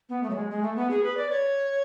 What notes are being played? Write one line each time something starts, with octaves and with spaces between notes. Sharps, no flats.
B3
A3
F#3
G#3
G#3
A3
B3
G#4
B4
D5
C#5